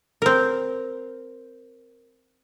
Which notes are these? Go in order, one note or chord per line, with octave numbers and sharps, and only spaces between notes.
C4 A#4